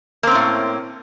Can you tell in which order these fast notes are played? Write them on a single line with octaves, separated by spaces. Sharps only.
A#3 C4 C#4 A2